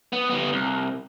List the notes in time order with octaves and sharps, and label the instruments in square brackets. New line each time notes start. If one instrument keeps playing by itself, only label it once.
[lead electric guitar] B3
G3 B3
C2